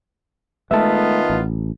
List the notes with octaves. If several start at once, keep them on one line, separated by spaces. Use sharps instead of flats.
D#3 G#3 A3 B3 F4 E5 A5
A1